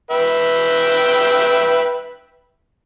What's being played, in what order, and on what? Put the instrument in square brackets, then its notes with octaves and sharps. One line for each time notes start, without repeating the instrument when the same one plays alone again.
[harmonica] B4 E5 G5